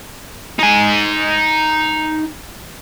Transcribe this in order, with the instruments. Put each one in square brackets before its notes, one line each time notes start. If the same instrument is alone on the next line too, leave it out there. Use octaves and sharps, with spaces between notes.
[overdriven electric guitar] D#4 G#5